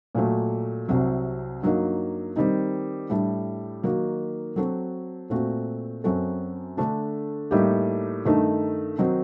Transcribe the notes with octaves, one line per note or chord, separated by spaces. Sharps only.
A#2 F#3 A3
C2 C3 F#3 C4
G2 F#3 A#3 D#4
D#3 G3 C4 D#4
A2 G3 D4
D#3 F#3 A#3 D#4 F#4
F#3 C4 F#4 A4
A#2 A3 C4 F#4
F#2 F#3 C4 F#4 A4
D3 A3 D4
A2 G3 A#3 D#4 G4
G2 D#3 A3 D#4
D#3 F#3 C4 D#4